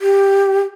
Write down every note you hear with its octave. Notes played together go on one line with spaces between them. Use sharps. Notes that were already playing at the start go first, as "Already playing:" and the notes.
G4